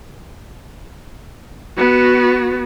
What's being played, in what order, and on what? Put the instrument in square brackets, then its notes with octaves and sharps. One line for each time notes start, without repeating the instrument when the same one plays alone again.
[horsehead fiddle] B3 F#4